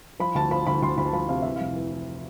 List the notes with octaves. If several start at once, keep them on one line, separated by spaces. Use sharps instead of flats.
F3 B5
D2 A5
F3 B5
D2 B5
D2 C6
D2 B5
A5
F3 B5
C3 F5
E3 E5
F1 F5
E3
E3